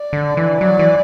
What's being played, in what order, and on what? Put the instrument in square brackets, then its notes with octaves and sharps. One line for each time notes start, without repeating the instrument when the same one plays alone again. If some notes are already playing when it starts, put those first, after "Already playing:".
Already playing: [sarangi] D5
[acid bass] D3
E3
[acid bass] F#3 [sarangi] D5
[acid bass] E3